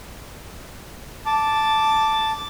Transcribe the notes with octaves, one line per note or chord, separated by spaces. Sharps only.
A5 D6